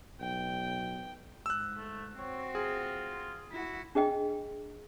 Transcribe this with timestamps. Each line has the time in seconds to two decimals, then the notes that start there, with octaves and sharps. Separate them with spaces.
0.20 B1 G5
1.46 G#2 E6 F#6
1.77 A3
2.19 C4 F#4 C#5
2.55 F4 G#4
3.51 E4 F#4
3.95 D4 G#4 D#5 G5